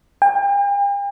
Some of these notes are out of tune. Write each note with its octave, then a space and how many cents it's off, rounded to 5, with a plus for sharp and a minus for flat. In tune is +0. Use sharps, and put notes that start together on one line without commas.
G5 +40